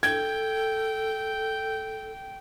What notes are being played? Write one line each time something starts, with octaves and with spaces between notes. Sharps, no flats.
A4 G5 G#6